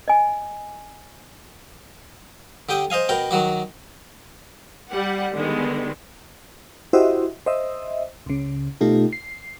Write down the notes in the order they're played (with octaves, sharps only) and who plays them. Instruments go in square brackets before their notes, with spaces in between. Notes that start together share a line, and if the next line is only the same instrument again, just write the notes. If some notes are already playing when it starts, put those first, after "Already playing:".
[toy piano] D#5 G#5
[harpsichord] D3 G4 G5 D#6
C5 D#5 F5 G#5
B2 A#4 G5
D#3 F#3 F#4 D6
[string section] G3 F#5
D3 D#3 G3 G#3 B3
[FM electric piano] E4 F#4 G4 C5 D#5 E5
C5 D#5 E5
C#2 C#3
B2 A3 D#4 F4 G4
C7